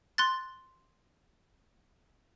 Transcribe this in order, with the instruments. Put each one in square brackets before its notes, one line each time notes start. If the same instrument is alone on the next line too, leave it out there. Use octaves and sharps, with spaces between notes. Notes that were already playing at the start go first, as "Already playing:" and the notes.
[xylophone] C6 F#6 A6